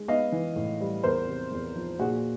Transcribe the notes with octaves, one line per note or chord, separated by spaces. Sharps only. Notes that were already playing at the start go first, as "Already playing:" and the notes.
Already playing: G#3
B3 D#5 F5
E3
A2
G3
E2 A#4 C5
C3
E2
F3
A#2 F#4 G#4